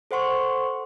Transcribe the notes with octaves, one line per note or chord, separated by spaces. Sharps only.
A4 C5 F#5 C6 C#6